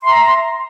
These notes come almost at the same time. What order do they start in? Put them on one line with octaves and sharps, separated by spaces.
C6 E5 A#5